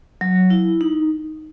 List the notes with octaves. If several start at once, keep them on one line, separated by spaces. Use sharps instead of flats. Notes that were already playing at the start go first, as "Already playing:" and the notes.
F#3
E4
D#4